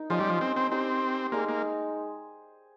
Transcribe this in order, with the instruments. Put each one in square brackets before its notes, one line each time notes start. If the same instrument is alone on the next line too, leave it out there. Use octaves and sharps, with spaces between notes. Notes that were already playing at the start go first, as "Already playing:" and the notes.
Already playing: [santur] D#4 A#4
[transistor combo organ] F3 [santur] C#4 G4 C5 D#5
[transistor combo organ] G3
F3
C4
C4
[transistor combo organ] C4 [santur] D#4 G4 C5
[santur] G#3 D#4 G#4 [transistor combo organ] A#3
[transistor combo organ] A#3